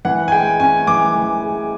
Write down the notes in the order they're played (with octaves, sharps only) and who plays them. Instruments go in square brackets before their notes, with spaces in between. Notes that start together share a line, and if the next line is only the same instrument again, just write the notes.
[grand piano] E3 F#5
G#5
G#3 G5
C#4 G#5
E3 D6
E3
G#3